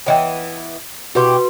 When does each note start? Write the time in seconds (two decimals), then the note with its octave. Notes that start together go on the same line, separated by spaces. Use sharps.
0.06 E3 B3 C#5 D#5 G5
1.15 B2 E4 F#4 G4 B4 C6